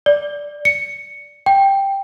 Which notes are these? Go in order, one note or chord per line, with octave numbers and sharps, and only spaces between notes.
D5
C#7
G5